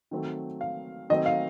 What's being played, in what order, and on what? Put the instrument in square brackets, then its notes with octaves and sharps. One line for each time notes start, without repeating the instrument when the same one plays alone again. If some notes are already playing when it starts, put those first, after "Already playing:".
[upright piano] D#3 F#3 A3 C4
F5
D#3 F#3 A3 C4 D#5
F5